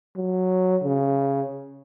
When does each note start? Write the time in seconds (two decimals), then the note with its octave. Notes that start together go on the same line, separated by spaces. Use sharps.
0.16 F#3
0.84 C#3